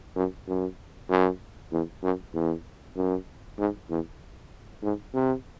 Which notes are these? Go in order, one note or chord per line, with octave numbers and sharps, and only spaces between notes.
F#2
F#2
F#2
E2
F#2
E2
F#2
G#2
E2
G#2
C3